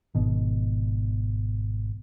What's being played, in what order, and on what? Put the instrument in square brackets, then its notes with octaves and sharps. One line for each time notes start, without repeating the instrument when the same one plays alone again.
[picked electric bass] G#1 B2 D#3